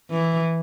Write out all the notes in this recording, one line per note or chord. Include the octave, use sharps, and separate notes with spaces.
E3